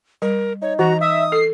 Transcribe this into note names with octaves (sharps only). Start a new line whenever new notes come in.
G3 A#4
D#4 C#5
E3 F#4 A#5
E5 D#6
A4 C7